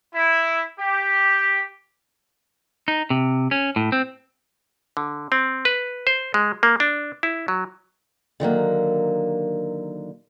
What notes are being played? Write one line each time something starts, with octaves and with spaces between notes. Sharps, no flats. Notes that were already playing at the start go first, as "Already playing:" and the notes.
E4
G4
D#4
C3
C#4
A2
C4
D3
C4
B4
C5
G#3
A#3
D4
E4
F#3
D3 D#3 F#3 A#3